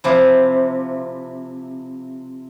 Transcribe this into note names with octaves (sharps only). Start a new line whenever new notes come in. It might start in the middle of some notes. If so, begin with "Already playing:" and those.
C3 F3 E4